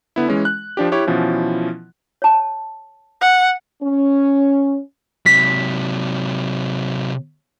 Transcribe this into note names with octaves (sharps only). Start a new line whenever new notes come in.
D3 B3 E4
E3 G#3 C#4
F#6
F3 D4 G4
E4 G4 C#5
B2 E3 F3 C#4 E4
C#5 A5
F#5
C#4
C3 F#3 B6